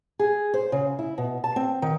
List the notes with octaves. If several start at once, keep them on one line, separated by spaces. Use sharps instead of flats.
G#4
C5
C#3
E4
B2
A5
C4
D#3